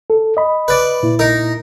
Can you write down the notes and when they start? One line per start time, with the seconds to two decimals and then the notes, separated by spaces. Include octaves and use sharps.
0.10 A4
0.37 D#5 B5
0.68 B4 D5
1.03 A#2 E4
1.19 D#4 A#4